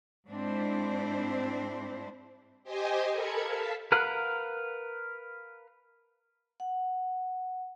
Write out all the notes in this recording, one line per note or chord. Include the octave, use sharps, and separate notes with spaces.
G#2 C4 D4 E4 C5
G4 C5 D#5 G#5
A4 A#4 B5 G#6 C#7
F5 A5 B6
A#4 B4 F5 F#5
F#5